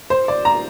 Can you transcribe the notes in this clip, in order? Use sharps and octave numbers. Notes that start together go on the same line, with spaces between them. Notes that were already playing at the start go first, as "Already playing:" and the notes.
C5
D5
A#5